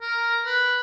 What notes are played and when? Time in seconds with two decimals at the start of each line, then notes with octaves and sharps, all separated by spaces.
0.01 A#4
0.46 B4